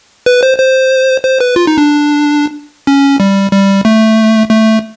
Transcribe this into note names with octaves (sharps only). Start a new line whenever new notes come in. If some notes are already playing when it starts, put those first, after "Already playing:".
B4
C5
C5
C5
B4
F4
D#4
D4
C#4
G3
G3
A3
A3